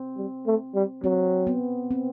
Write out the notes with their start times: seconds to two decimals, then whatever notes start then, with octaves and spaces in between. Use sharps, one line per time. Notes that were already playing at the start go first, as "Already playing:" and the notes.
Already playing: C4
0.17 G3
0.46 A3
0.75 G3
1.03 F#3 C4
1.47 B3
1.91 C4